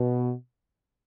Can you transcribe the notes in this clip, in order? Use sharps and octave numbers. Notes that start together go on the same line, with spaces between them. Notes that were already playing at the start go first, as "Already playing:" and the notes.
Already playing: B2